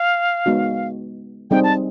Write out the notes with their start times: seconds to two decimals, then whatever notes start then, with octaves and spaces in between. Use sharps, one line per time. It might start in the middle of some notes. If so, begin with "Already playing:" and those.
Already playing: F5
0.46 G#3 B3 D#4 F#4
1.51 G3 C4 D#4 G#4 G5
1.64 A5